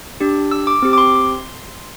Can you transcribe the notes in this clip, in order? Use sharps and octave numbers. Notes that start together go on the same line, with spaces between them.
D4 G4
E6
D6
C4 G4
D6
C6